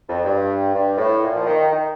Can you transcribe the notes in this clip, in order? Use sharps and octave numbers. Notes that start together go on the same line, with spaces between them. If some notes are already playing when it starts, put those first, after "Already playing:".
F2
G2
G2
A2
A#2
F3
D#3
D#3